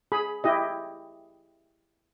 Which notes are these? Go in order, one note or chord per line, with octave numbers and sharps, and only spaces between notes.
G#4 B5
E4 G4 D#5